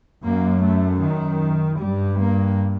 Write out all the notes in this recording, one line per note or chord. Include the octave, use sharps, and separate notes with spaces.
F#2 A#3
A3
D#3
G2 G3
A#3